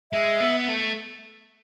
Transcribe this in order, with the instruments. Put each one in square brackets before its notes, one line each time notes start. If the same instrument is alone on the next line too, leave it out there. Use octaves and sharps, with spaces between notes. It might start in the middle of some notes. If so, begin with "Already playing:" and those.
[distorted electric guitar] G#3 [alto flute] E5
[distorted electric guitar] B3
A3